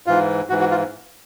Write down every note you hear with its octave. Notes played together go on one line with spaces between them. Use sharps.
G#2 E3 F4
G#2 E3 F#4
F#4
F4